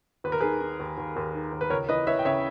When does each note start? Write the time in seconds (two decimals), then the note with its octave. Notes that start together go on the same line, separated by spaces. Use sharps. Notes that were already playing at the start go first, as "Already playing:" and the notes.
0.24 D#2 B4
0.32 A#4
0.40 D#3 G#4 B4
0.61 D#3
0.80 D#2
0.98 D#2
1.16 D#2
1.34 D#3
1.52 D#2
1.61 B4
1.70 C#2 A#4 C#5
1.89 E3 B4 D#5
2.07 E3 C#5 E5
2.19 G5
2.25 C#3 C#5 E5